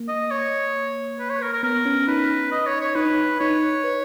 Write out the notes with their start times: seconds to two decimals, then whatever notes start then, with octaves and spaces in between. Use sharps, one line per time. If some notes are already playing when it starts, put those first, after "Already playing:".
Already playing: A#3
0.08 D#5
0.31 C#5
1.20 B4
1.30 C#5
1.42 A#4
1.53 A#4
1.63 B3 A#4
1.85 C#4
2.08 D#4 B4
2.51 D#5
2.67 C#5
2.81 C#5
2.95 D#4 B4
3.40 D#4 C#5
3.84 B4